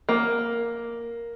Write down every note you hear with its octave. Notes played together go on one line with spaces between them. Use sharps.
A#3